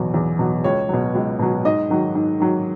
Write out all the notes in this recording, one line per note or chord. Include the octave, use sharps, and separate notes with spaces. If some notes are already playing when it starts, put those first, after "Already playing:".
Already playing: E2 B2 F#3
E2
B2 F#3
C#2 C#5
B2 F#3
C#2
B2 F#3
G#2 D#5
D#3 F#3
G#2
D#3 F#3